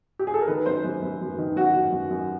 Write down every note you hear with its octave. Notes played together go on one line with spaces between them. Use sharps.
G4
G#4
A4
A#4
D#3 B4
F#2 C5
F#2
F#2
F#2
D#3
F#2 F#4
F#2
F#2
F#2